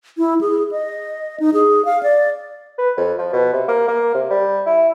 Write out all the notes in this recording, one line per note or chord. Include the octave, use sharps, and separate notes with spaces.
E4
G#4
D#5
D#4
G#4
F5
D5
B4
F2
F3
B2
C3
A#3
A#3
C3
G3
E4